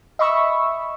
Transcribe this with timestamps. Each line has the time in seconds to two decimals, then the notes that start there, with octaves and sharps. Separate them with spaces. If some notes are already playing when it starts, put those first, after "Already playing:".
0.19 D#5 E5 B5 C#6 E6